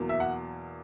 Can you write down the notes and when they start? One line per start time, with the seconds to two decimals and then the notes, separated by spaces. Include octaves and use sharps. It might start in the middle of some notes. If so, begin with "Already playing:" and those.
Already playing: E2 B2 F#3 A#3
0.09 E5
0.20 F#5